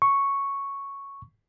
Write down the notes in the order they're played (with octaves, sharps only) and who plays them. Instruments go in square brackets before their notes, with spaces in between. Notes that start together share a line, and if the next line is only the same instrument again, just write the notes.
[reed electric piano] C#6